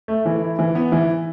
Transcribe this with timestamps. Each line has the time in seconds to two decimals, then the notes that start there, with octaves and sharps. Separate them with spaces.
0.08 A3
0.25 E3
0.42 E4
0.59 E3
0.75 B3
0.92 E3